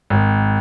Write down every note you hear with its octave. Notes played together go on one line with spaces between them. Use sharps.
G#1